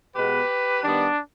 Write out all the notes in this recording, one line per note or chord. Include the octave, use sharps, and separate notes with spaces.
B2 G#3 B3 G4 B4
D#3 G3 B3 D4